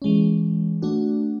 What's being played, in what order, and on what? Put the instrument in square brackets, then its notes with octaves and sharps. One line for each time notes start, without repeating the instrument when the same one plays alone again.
[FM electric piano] E3 G#3 C#4
A3 D4 F#4